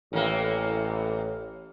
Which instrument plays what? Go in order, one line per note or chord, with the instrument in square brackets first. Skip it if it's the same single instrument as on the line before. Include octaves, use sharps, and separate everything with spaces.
[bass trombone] A1 [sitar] A2 E3 A#3